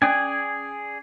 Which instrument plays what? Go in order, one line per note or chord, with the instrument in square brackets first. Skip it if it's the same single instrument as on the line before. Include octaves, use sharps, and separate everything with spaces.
[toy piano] C#4 [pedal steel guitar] G#4 D5 G#5